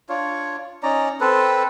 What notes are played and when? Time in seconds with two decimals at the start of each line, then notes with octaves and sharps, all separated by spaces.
0.09 D4 F4 C#5
0.83 C#4 D#4 D5 A#5
1.21 C4 A4 B4